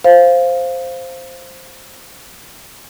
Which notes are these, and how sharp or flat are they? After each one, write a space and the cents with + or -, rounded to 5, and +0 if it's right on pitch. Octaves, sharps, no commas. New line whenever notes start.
C5 +0 F5 -5